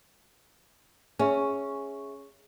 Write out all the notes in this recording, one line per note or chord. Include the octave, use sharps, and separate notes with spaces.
C#4 G#4 E5 C#6